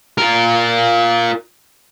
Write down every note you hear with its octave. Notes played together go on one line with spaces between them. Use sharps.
F4 A#4